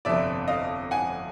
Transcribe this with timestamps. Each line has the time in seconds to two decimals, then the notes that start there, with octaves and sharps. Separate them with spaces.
0.05 G1 F2 C3 D5 E5
0.48 D#5 F5
0.91 F#5 G#5